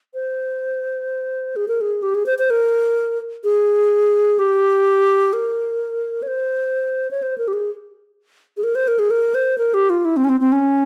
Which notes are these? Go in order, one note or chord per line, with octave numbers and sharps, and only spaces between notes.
C5
G#4
A#4
G#4
G4
G#4
C5
C5
A#4
G#4
G4
A#4
C#5
C5
C#5
C5
A#4
G4
G#4
G#4
A#4
C5
A#4
G#4
A#4
C5
A#4
G4
F4
E4
C4
C#4
C4
C4
C#4